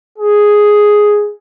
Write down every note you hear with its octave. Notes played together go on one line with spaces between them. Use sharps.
G#4